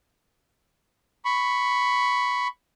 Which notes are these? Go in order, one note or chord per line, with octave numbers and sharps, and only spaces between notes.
B5 C#6